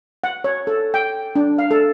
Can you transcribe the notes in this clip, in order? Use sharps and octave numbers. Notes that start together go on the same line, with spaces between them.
F#5
C#5
A4
G5
D4
F5
A4